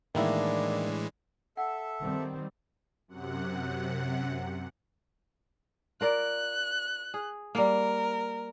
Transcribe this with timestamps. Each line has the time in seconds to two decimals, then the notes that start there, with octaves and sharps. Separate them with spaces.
0.15 A2 D#3 E3 G#3 A#3 D4 E4
1.57 A4 E5 F#5
2.01 D#3 G3 C4
3.08 F#2 C3 F#5
6.01 F4 A#4 D5 F#6
7.14 G#4
7.55 G3 A#3 A#4